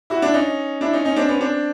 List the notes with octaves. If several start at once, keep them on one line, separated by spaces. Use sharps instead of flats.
E4 F#4
D4 E4
C#4 D#4
D4 E4
C#4 D#4
C#4 D#4
C4 D4
B3 C#4
C4 D4